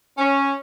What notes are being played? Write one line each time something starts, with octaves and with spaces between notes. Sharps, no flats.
C#4